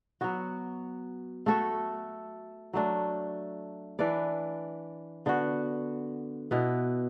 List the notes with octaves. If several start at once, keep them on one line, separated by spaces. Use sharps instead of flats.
F#3 B3 F#4
A3 F#4 A4 E5
F#3 A3 D4
E3 D4 B4 D5
D3 B3 F#4
B2 B3 E4 B4